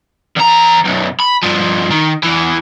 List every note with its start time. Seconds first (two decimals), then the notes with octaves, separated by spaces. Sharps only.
0.37 E2 A#5
0.85 B1 F#2
1.19 B5
1.43 G2 F3
1.91 D#3
2.23 E2 E3